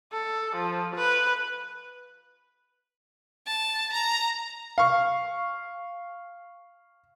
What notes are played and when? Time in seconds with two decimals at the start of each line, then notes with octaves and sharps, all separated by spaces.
0.12 A4
0.56 F3
0.96 B4
3.47 A5
3.93 A#5
4.78 F5 C#6